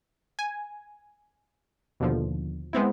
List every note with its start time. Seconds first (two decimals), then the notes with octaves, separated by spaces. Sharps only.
0.39 G#5
2.00 D#2 B2 D3 F3
2.73 G#3 B3 C4 E4